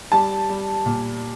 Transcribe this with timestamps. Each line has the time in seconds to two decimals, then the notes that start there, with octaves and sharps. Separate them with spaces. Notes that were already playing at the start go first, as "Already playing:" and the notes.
0.12 G3 A5
0.49 G3
0.86 A#2